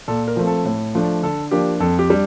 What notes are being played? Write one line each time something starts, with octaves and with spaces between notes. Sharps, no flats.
A#2 A4
A#4
F3 A3 C4
A4
A2
F3 A3 D4
D3 A4
F3 A#3 D4 G4
F2 A4
G4
G3 D4